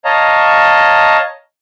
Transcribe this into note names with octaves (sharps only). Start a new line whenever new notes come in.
C#5 D#5 F5 A5 A#5